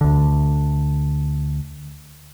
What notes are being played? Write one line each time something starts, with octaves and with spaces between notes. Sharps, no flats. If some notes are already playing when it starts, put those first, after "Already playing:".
D2 D3